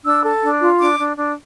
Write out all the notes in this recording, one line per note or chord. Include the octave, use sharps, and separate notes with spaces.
D4 E6
A4
D4
F4
D4 D6
D4
D4